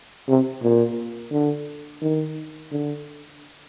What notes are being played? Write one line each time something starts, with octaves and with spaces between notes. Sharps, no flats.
C3
A#2
D3
D#3
D3